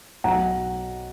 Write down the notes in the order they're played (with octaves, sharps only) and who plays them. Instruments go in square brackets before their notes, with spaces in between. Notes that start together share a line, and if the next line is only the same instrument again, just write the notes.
[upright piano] B1 F#5 A#5